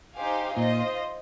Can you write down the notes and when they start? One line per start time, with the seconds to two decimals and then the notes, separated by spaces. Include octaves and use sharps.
0.15 D#4 G4 C5 F5 G#5
0.56 A#2 F4 C5 D#5